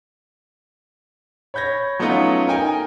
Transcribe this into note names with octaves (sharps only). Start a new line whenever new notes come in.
C#5 B5 G6 G#6 A#6
F#3 A3 B3 C#4 D#4 F4
D#4 A#4 G5 G#5